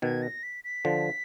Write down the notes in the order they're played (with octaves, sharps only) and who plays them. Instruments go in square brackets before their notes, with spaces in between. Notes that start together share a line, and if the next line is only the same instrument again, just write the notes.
[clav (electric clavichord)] B2 D#3 [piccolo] G#6
[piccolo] A#6
B6
B6
[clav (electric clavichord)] D3 F3